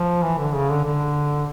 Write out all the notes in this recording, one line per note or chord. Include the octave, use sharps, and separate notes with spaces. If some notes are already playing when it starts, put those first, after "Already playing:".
Already playing: F3
E3
D3
C#3
D3
D3